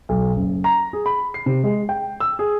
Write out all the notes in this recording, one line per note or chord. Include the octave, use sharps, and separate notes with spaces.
B1
F#1
A#5
G#4
B5
C7
C3
G#3
G5
E6
G#4